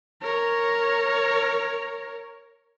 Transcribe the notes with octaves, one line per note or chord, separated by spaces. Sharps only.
A#4 C#5